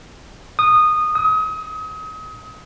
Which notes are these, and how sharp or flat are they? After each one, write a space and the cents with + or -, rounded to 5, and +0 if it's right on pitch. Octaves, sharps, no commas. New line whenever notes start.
D#6 -15
D#6 +35